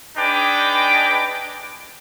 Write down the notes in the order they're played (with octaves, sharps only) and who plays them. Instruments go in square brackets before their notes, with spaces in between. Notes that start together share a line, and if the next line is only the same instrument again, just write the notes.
[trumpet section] D4 D#4 G#4 B4 G5 D6